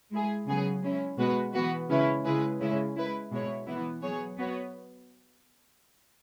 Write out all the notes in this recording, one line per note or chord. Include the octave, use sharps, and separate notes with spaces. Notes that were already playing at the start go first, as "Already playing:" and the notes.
G#3 E4 G#4
C#3 F#3 B3 G#4
G#3 C#4 E4
B2 G#3 B3 F#4 B4
E3 B3 F#4 B4
C#3 G#3 C#4 E4 B4
C#3 G#3 E4 G#4 B4
C#3 G#3 C#4 E4
G#3 E4 B4
B2 G#3 E4 C#5
E3 B3 E4
F#3 B3 G#4 C#5
B3 F#4 C#5